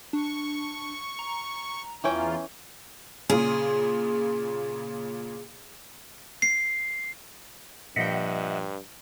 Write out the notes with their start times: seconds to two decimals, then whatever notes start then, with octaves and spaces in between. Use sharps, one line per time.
0.13 D4 C#6
1.19 A#5
2.04 E2 E3 C#4 F4 G5
3.30 A#2 C#3 G#4
6.42 C7
7.96 G2 A#2 F3 D#5 E5 F#5 G5